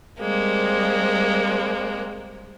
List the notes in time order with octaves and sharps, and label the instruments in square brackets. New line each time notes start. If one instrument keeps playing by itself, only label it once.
[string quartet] G3 G#3 A#3 C4